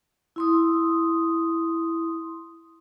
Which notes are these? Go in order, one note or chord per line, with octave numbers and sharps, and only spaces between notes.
E4 C6 D#6